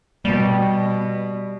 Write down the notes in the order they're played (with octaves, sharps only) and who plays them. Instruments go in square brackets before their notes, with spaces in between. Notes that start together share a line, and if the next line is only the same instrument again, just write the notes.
[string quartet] B2 [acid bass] G3